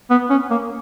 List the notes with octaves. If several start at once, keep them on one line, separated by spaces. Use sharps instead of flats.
B3
C#4
A#3